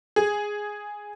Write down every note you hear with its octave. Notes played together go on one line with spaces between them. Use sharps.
G#4